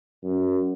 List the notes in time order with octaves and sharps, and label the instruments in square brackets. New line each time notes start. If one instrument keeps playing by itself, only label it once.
[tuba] F#2